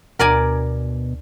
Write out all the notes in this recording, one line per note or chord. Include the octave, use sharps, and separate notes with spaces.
D2 B2 A#4 D5 G#5